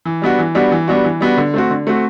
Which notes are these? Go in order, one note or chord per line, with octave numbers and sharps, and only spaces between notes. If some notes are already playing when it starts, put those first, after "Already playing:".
E3
G3 B3 D4 F#4
E3
G3 B3 D4 F#4
E3
G3 B3 D4 F#4
E3
G3 B3 D4 F#4
D3
A3 C4 F#4
D3
A3 C4 F#4